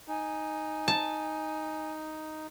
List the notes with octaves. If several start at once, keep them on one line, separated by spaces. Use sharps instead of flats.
D#4 G#5
A5